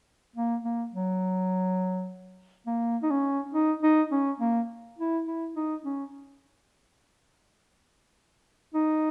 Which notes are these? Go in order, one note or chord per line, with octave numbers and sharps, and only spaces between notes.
A#3
A#3
F#3
A#3
D#4
C#4
D#4
D#4
C#4
A#3
E4
E4
D#4
C#4
D#4